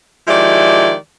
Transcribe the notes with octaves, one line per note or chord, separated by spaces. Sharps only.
D#3 F3 G#3 E4 G4 D5